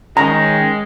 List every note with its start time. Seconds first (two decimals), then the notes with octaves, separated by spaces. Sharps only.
0.17 D#3 G#3 C#4 D#5 A#5